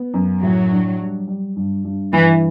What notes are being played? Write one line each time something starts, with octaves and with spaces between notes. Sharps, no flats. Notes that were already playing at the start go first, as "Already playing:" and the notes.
Already playing: B3
F#2
A2 F#3
D4
G3
G3
G2
G2
G2 E3